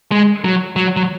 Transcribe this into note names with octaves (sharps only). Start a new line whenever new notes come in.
G#3
F#3
F#3
F#3